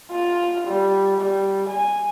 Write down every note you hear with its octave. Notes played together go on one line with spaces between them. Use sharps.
F4
G3
G3
G#5